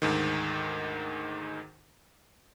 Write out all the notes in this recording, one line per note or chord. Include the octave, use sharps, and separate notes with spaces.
D2 G#2 D#3